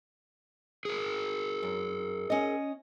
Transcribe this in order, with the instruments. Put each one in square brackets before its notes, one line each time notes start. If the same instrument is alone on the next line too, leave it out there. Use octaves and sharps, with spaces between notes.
[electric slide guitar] G#4 A#4
[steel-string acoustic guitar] F#2
C#4 D#5